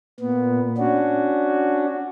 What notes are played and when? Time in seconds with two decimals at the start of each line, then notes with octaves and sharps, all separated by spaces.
0.20 A#2 B3
0.78 C#4 D4 F#4